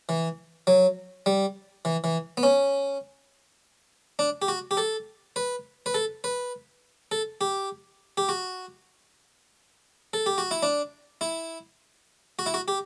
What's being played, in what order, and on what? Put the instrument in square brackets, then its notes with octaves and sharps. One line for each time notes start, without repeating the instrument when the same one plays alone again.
[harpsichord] E3
F#3
G3
E3
E3
B3
C#4
D4
G4
F#4
G4
A4
B4
B4
A4
B4
A4
G4
G4
F#4
A4
G4
F#4
E4
D4
E4
F#4
E4
F#4
G4